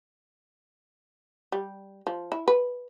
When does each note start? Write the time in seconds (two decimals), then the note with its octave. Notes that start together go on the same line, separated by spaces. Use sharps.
1.52 G3
2.07 F3
2.32 E4
2.48 B4